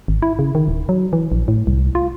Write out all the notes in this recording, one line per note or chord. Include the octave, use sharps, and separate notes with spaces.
G#1
E4
C#3
D#3
D1
F#3
E3
A#1
A2
C2
F4